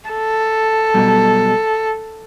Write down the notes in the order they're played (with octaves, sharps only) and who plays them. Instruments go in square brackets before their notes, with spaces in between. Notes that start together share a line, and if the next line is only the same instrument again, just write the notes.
[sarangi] A4
[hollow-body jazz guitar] B1 B2 G3